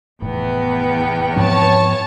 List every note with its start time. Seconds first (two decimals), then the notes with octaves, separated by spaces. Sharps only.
0.22 F1 E2 A2 B3 G5
1.36 G#2 F3 C4 C#5 A5